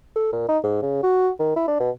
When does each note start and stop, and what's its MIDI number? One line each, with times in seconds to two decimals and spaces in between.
0.16 0.28 69
0.33 0.48 46
0.49 0.58 63
0.63 0.79 44
0.82 0.99 49
1.03 1.30 66
1.39 1.55 51
1.56 1.64 64
1.68 1.76 62
1.80 1.90 47